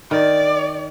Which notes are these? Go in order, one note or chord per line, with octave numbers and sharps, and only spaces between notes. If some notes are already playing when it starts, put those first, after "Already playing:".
D#3 D5